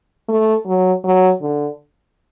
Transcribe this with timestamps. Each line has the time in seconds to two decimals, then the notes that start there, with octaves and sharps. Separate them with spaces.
0.29 A3
0.66 F#3
1.04 F#3
1.42 D3